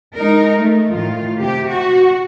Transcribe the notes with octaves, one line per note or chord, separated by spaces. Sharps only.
G#3 D#4 A#4
A3
A2 D#3 F4
C3 G4
F#4